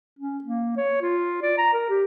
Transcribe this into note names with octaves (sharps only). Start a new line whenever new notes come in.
C#4
A#3
C#5
F4
D5
A#5
A#4
G4